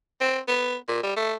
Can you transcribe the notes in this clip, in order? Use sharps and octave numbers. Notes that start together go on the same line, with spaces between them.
C4
B3
A#2
G3
A3